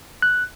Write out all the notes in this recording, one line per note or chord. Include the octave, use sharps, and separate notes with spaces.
F#6